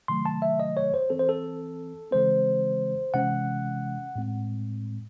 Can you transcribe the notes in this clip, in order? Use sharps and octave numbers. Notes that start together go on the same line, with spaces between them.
C3 D#3 F#3 A3 C6
A5
E5
D#5
C#5
C5
E3 C4 A4
C5
A4
C#3 E3 G#3 C4 C5
C3 E3 G#3 C#4 F#5
A2 G#3 C4